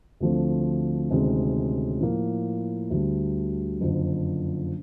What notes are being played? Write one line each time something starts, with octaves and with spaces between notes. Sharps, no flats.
D2 D3 F3 A3 C4
D2 C3 D#3 G#3 C#4
A2 F3 A#3
D2 D3 G3
F#1 F2 D3 F3